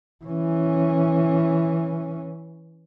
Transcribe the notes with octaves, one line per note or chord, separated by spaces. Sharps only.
E3 C#4